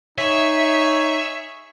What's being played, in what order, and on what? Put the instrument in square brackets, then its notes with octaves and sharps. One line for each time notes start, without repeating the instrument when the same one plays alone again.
[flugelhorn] D#4 [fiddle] G#4 C#6 [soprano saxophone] C#5 [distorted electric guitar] E5